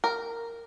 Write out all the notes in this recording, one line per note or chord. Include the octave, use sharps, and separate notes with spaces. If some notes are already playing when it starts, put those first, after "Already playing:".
A#4